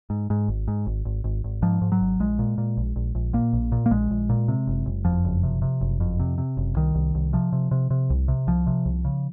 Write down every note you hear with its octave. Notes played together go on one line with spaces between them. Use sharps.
G#2
G#2
G#1
G#2
G#1
G#1
G#1
G#1
G#2 F3
G#2
F#3
G#1
A#1 G#3
A#2
A#2
A#1
A#1
A#1
A#2 A#3
A#1
A#2
A#3
A#1 G#3
A#1
A#2
C3
F#1
F#1
F2 F3
F#1
C3
C3
F#1
F2
C3
C3
F#1
C2 D#3
C2
C2
C3 F3
C3
C3
C3
C2
C3
C2 F3
C3
C2
C#3